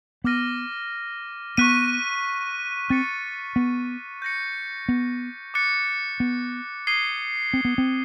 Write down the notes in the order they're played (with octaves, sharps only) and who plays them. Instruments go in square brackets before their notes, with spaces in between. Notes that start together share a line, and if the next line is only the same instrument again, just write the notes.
[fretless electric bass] B3 [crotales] D6 F6 A#6 D#7
[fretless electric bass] B3 [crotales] C#6 F#6 B6 D#7
[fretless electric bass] C4 [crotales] F#6 A6 C#7
[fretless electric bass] B3
[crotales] G6 A#6 C#7
[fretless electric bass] B3
[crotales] D6 F#6 A6 C#7
[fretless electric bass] B3
[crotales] D#6 G#6 C7 D#7 G7
[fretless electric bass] C4
B3
C4